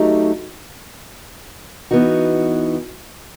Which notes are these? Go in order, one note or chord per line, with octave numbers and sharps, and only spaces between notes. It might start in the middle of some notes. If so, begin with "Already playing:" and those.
Already playing: F#3 A3 D#4 G4
E3 B3 D#4 F#4